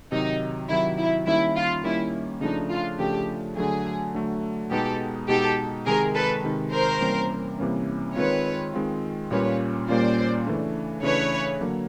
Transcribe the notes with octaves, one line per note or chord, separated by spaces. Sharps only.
C3 D#3 F#3 D#4
C3 D#3 F#3 E4
E4
D#3 G3 A#3 C#4 E4
F4
D#3 G3 A#3 C#4 E4
C#3 F3 A3 D4 D#4
F4
C#3 F3 A3 D4 G4
D3 F#3 A3 G#4
D3 F#3 A3
B2 G#3 B3 D#4 G4 A4
B2 G#3 B3 D#4 G4 A4
C3 D#3 G#3 G#4 A#4
A4 B4
C3 D#3 G#3
A#4 C5
C3 E3 G3 A#3 C#4
C3 E3 G3 A#3 C#4
D#3 G#3 C4 F4 B4 C#5
D#3 G#3 C4 F4
A#2 G3 A#3 C#4 F4 B4 C#5
A#2 G3 A#3 C#4 F4 C5 D5
C#3 E3 A3 D4
C#3 E3 A3 D4 B4 C#5
D3 F#3 A#3